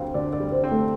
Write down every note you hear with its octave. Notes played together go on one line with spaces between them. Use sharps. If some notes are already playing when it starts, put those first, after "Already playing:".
Already playing: D2 G3 C4 F5
D3 D5
D5
G3
C5
C4
A3